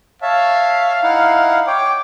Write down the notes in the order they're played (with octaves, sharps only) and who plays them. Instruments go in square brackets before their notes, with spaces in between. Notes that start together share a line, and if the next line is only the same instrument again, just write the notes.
[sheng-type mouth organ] C#5 E5 A5 [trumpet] F5
[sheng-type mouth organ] D#4 E4 F#5
[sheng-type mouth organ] C#5 G5 [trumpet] D6